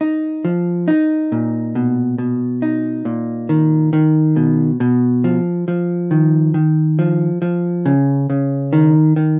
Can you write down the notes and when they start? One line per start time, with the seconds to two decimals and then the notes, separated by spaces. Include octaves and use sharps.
0.01 D#4
0.45 F3
0.88 D#4
1.32 A#2
1.75 B2
2.18 B2
2.62 D#4
3.05 A#2
3.49 D#3
3.93 D#3
4.36 B2
4.80 B2
5.24 F3
5.68 F3
6.11 D#3
6.54 D#3
6.99 F3
7.42 F3
7.86 C#3
8.30 C#3
8.73 D#3
9.16 D#3